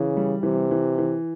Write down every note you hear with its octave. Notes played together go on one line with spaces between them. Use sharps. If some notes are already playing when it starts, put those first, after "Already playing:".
Already playing: C#3 E3
G3
C3 E3
E3
E3